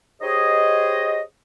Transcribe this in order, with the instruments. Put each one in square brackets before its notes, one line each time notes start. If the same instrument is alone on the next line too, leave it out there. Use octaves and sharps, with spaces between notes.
[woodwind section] G4 G#4 C5 C#5 D#5